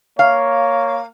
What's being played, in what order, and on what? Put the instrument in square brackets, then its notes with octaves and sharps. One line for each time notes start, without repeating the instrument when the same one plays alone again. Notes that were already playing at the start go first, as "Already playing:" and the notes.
[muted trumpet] A#3 [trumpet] C#5 [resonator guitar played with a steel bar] F5